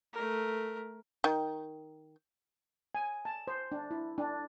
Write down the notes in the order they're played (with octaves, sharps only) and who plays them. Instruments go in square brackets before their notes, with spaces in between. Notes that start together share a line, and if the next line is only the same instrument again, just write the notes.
[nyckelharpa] A3 A#4
[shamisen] D#3
[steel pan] G#5
A5
C5
D4
E4
D4